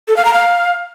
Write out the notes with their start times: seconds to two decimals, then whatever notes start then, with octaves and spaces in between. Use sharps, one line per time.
0.08 A4
0.17 F5
0.25 A#5
0.34 F5